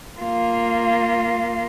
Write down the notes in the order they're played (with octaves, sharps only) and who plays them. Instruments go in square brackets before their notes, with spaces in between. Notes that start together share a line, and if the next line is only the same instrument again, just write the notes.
[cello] A#3 F4